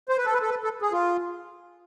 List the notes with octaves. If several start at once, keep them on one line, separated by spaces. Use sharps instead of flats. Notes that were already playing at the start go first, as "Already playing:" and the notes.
C5
B4
A4
B4
A4
B4
A4
G#4
F4